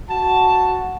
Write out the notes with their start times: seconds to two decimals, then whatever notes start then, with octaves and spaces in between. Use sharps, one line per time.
0.11 F#4 A5